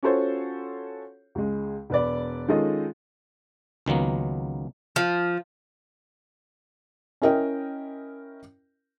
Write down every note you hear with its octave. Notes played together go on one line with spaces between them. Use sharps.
C#4 F4 F#4 A4 C5 C#5
C#2 G#3
E1 B4 D5
D#3 G#3 C#4 F4 A4 D#5
C#2 D#3 F#3 A#3 B3
F3
C#4 E4 A#4 D#5 G5